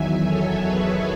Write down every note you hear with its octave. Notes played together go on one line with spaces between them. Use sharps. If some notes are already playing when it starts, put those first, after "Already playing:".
Already playing: E2 D#3 F#3 E5 G#5
A4 C#5
G#4 B4